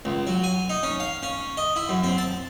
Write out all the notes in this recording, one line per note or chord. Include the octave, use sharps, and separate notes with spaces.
C#2
F#3
G#5
D#4
C#4
F5
C#4
D#5
E4
F#2
C4
A5